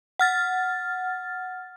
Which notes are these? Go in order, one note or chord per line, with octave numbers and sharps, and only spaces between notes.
F#5 F6 A6